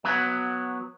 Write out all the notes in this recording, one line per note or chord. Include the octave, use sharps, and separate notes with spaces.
F#3 B3